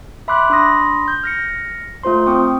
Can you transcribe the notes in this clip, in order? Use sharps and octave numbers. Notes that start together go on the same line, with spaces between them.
E5 B5 C6 D6 F#6
D4 B5 C6 D#6 A#6
G6
F6 A#6 C#7
A3 F4 C5 C6
C4 G5 C#6 D#6